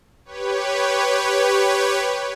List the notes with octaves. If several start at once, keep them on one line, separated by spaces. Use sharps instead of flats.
G4 B4 C#5